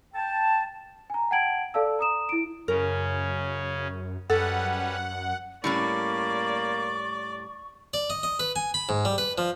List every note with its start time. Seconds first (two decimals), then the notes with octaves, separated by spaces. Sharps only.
0.14 G5 A5
1.10 G#5 A#5
1.31 F#5 G5 A5 G#6 D7 F#7
1.74 A4 D5 F5 A5 E6
1.99 A#5 D#6 E7
2.29 E4 D7
2.68 F#2 C#3 C#4 A#4
4.30 F#2 G3 C#4 A4 B4 F#5
5.64 A2 G3 A#3 C#4 D5 C#6
7.94 D5
8.10 D#5
8.23 D#5
8.40 B4
8.56 G#5
8.74 B5
8.89 G#2
9.05 G3
9.18 B4
9.38 F3